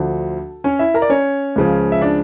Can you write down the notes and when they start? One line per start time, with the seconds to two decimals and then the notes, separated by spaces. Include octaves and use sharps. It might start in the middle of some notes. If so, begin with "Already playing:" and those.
Already playing: D2 D3 F3 A4
0.64 C#4 C#5
0.79 E4 E5
0.94 A#4 A#5
1.02 D5
1.10 C#4 C#5
1.56 C#2 C#3 F3
1.92 E5
2.01 D4 D5